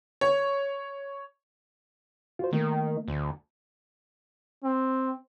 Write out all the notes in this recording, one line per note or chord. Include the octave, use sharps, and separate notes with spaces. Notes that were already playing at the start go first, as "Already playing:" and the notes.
C#5
F4 F#4 C5
D#3 A3 A#3
D2
C4